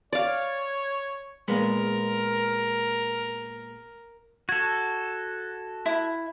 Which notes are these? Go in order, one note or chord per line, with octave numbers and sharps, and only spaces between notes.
C#5 D5 F5
A#2 G#3 B3 A#4
F#4 A4 G#6
E4